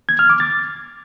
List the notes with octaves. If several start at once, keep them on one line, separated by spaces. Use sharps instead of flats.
G#6
F6
D6
A6